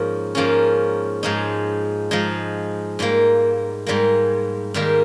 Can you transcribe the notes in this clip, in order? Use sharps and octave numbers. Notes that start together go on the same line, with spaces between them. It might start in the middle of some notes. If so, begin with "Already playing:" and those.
Already playing: G#2 F3 A#3 C#4
G#2 F3 A#3 C#4
G#2 F3 G#3 D#4
G#2 F3 G#3 D#4
G#2 G3 A#3
G#2 G3 A#3
G#2 D#3 G3 A#3